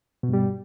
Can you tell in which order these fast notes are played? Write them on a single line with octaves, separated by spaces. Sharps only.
B2 G2 G3